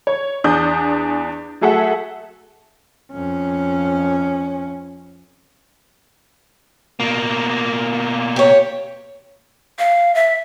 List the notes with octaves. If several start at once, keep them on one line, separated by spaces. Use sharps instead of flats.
C#5
E2 D4 D#6 G6
F#3 A3 G#4 A4 E5 F#5
F2 C#4
B2 A#3
G4 C#5
F5
E5